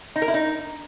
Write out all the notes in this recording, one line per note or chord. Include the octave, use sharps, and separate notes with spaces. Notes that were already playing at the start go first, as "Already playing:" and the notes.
D#4
A#4
E4
D#4